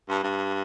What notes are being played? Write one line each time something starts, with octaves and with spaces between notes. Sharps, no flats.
G2
G2